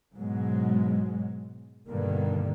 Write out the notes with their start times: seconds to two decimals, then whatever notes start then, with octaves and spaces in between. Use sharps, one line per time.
0.15 G#2 B2 F#3 G#3
1.87 G2 B2 D3 D#3 G3 A#3